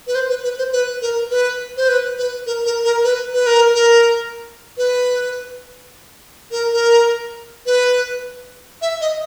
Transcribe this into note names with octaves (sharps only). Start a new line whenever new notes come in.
B4
C5
B4
B4
C5
B4
A#4
B4
C5
B4
B4
A#4
A#4
A#4
B4
B4
A#4
A#4
B4
A#4
A#4
B4
E5
D#5